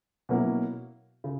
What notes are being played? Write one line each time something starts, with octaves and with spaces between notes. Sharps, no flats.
B2 F#3 A#3 C#4 E4
C#3